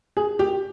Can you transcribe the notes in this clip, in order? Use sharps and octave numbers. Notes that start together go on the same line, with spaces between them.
G#4
G4